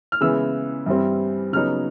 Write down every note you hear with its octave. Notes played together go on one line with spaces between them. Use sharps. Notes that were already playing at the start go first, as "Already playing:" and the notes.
F6
C#3 E3 G#3 B3 E6
G2 E3 G3 C4
C#3 F#3 B3 D#4 F6